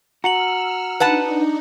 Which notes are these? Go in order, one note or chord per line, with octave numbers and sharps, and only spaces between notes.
F#4 A#5 E6 F6 C#7 F#7
D4 D#4 B4 F#5 A5